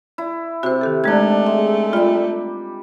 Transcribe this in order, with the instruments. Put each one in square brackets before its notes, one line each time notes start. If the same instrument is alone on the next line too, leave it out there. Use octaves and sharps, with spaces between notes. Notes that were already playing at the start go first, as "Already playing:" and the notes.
[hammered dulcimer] E4
[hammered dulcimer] C3 [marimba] F#4 C5
[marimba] D#3 G4 A4
[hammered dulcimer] D#3 D4 [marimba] G#3 G#6 [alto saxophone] A3
[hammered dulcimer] G#3 [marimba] E5
[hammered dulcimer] G3 G5 [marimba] F4